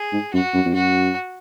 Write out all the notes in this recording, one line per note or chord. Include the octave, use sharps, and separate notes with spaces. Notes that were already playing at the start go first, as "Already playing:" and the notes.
Already playing: G#4
G#2
F#2 F#4
F#2
F2
F#2 F#4